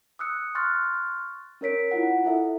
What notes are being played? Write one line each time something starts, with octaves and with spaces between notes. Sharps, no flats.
D#6 E6 F#6 C#7
C6 C#6 F6 F#6 A6
C#4 A#4 C#5 B6 D7
E4 F4 F#5
E4 A4 E5